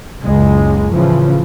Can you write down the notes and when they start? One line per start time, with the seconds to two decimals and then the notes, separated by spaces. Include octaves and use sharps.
0.23 F#1 C#2 G#3
0.94 A2 C#3 E3 F3